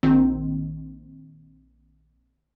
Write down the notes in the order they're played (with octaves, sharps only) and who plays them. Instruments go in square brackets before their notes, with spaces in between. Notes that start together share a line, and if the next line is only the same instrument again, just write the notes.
[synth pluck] A#1 D#3 C4